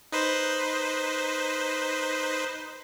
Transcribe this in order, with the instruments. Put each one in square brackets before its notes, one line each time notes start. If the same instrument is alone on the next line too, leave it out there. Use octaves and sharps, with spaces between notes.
[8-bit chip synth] D#4 B4 C5